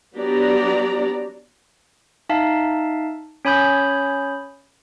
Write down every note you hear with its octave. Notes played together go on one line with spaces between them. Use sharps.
F#3 B3 D4 G4 D5 A#5
D#4 E5 F5 A5
C#4 C#5 G#5 B5 D#6 G6